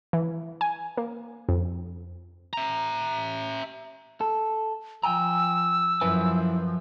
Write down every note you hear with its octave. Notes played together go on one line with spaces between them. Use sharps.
E3
G#5
A#3
F2
E5 A#5
A4
F3 G5 G#5 A#5 E6
F#2 F3 E4 B4 G#5